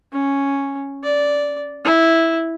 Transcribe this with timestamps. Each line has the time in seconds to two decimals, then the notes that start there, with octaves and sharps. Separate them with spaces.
0.13 C#4
1.04 D5
1.84 E4